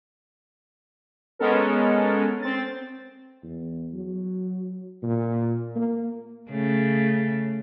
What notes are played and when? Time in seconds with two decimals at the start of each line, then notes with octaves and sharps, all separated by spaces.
1.39 G#3 B3 C#4 A4 A#4
2.42 C4 A6
3.43 E2
3.94 F#3
5.03 A#2
5.75 A#3
6.51 C#3 A3